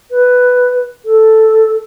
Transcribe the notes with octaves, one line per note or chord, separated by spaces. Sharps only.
B4
A4